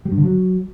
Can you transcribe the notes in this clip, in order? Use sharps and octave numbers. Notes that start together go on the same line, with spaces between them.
G3
G2
D3
F#3